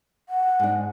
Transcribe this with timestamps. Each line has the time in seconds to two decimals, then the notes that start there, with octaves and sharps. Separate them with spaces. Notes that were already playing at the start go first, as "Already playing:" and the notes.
0.29 F#5
0.60 G#2 D4